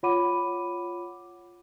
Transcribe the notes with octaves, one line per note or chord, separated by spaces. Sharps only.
F4 C#5 F#5 B5 D6 D#7